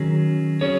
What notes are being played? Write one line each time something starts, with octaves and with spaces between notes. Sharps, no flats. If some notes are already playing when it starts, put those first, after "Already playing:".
Already playing: D#3 F#3 C#4 G#4
F#3 C#4 G#4 C#5